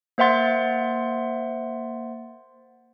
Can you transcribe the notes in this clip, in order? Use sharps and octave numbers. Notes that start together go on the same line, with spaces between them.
A#3 C5 E5 F#5 C6 A6